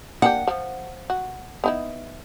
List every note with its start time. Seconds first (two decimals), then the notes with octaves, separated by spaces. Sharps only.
0.22 A#3 D4 G4 F#5
0.47 F3
1.10 F#4
1.64 B3 D#4 E4